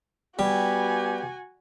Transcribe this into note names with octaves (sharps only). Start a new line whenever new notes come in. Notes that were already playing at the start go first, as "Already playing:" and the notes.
G3 B3 F#4 G4 G#5